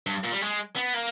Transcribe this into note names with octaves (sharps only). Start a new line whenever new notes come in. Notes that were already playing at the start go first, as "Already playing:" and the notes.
G2
A#2
G3
G#3
B3
A#3